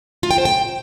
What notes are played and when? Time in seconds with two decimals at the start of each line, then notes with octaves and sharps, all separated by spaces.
0.23 F4
0.31 G5
0.38 C5
0.45 G5